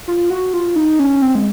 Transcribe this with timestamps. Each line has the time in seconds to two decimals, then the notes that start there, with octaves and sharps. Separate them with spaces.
0.08 F4
0.30 F#4
0.54 F4
0.76 D#4
0.99 C#4
1.22 C4
1.35 G#3